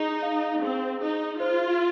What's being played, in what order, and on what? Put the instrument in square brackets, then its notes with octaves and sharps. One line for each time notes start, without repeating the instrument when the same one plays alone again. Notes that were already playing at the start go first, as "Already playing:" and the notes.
Already playing: [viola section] D#4 [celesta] G#4
[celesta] F5
[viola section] C4 [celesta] G#4
[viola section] D#4 [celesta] G#4
[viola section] F4 [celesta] C5